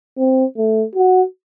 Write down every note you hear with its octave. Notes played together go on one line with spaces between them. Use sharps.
C4
A3
F#4